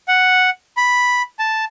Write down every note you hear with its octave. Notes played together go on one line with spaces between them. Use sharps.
F#5
B5
A5